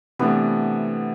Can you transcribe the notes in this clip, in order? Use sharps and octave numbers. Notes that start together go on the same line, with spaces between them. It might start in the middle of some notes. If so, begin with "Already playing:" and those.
C3 E3 A3 B3 D4